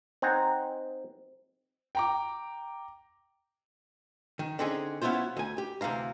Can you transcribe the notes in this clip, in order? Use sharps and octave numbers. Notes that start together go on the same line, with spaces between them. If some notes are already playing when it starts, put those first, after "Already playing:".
C4 D#4 F#5 G#5 A#5
G5 A#5 D6
D#3
D3 C4 C#4 D#4 G#4
F#3 B3 C#4 E4 F4 C5
D2 G#5
G4
D2 C3 E3 F5 A#5